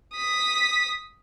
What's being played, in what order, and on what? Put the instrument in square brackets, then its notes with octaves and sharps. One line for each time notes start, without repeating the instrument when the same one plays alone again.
[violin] D#6 B6